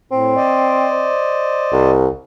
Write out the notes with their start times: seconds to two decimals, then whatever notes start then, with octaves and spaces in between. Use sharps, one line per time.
0.12 A2 C4
0.36 C5 D5 D#5
1.73 C2